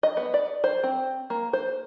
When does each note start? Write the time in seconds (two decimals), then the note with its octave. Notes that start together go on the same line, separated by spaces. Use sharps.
0.03 D#5
0.17 B3
0.34 D5
0.64 C5
0.83 C4
1.30 A#3
1.53 C5